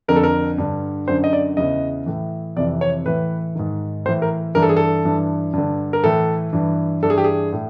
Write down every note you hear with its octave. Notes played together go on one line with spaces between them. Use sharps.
F2 D3 A#4
A4
A#4
G2 D3
F#2 D3 C5
D#5
D5
E2 C#3 E3 D#5
A2 E3
F2 C3 E3 D5
C#5
A2 E3 B4
G#2 D#3
A2 E3 C5
A#4
G2 E3 A#4
A4
G#4
A4
G2 E3
G2 D3
A#4
A2 E3 A4
G2 E3
G2 E3 A4
G#4
G4
G#4
A2